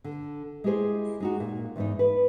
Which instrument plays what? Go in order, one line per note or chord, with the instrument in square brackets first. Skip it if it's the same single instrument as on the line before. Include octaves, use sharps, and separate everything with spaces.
[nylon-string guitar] D3
G#3 E4 G4 G#4 C5
G#3 D#4 F#4
A#2
E2 G#2 D#4
B4